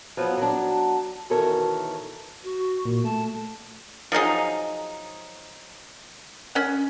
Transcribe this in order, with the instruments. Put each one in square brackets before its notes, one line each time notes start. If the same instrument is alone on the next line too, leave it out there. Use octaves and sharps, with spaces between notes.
[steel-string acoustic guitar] F3 F#3 B3
F#3 D4
B2 D#3 E3 A4 A#4 C#5
[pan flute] F#4
[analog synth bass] A#2
[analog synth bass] A3 [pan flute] A5
[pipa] F3 F#3 D#4 G#4
C#4 F#5